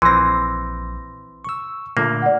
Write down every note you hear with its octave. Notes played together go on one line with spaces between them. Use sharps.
A#1 E3 C4 C6 A#6
C#6 E6
A#2 D3 A3 A#3
D5 F#5